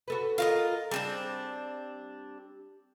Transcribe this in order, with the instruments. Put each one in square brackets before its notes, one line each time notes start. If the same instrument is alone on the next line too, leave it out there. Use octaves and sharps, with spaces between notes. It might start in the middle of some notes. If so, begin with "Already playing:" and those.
[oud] F#4 A4 B4
[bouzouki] F4 A#4 D#5
[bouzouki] G3 C4 D4 [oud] G#4